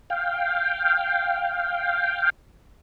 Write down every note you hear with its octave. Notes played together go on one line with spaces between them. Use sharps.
F5 G5